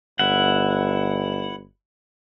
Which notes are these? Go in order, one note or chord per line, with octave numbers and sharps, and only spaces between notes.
G1 E4 F#5